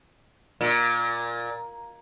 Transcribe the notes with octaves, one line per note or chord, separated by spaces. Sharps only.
A#2